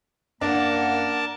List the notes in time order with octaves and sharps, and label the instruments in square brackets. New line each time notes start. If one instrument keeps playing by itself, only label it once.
[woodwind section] F#2 A#3 F#5 [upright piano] D4 [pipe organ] A#4 A5